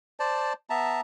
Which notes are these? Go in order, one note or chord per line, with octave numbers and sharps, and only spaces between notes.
C5 D5 A5
B3 E5 A5 A#5